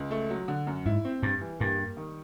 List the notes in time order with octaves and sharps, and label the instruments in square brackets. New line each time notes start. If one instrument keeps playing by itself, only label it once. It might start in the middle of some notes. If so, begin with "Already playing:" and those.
Already playing: [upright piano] C#2
A3
F#3
D3
F#2
[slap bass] G#2 [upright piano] E4
[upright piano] C4
[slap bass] G2 [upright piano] G3
[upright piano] E3
[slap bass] G2 [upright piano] A#3
[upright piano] G3
D#3